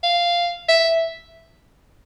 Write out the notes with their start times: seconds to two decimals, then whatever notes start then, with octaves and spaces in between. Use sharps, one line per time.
0.03 F5
0.69 E5